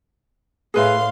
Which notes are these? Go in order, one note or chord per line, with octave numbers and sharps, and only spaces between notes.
A2 G#4 B4 E5 F5 C6